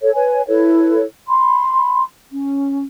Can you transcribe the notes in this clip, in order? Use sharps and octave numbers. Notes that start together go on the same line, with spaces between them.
A4 C#5
B4 C#5 G#5
E4 A4 B4 C#5
B5 C6
C#4